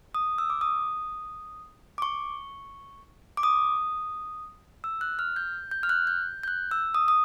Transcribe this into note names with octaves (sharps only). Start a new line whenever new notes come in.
D#6
E6
D6
D#6
D6
C#6
D6
D#6
E6
F#6
F6
G6
G6
F6
F#6
G6
G6
F#6
E6
D#6
D#6